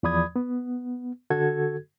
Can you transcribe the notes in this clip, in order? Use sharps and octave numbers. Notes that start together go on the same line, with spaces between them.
E2 F3 D5 B5 D#6 G#6
B3
D3 F#4 A4 G#6